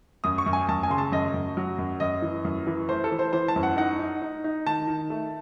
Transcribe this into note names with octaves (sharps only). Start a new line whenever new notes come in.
F#2 D#6
C#6
F#2
G#5
F#2 A5
G#5
C#3 C6
A5
F#2 D#5
F#2
F#3
F#2
F#2 D#5
E3
F#2
E3
A3 C5
A4
E3
C5
E3 C5
A5
F#2
F#5
D#4 F#5
D#4
D#4
D#4
D#3 A5
D#3
A3